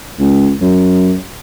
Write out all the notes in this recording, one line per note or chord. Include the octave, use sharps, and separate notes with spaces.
C#2
F#2